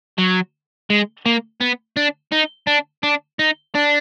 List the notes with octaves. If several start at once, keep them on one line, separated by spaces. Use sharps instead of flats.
F#3
G#3
A#3
B3
D4
D#4
D4
D4
D#4
D4